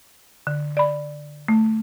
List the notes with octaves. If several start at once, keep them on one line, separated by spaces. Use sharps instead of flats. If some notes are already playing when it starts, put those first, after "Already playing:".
D3
D5 B5
A3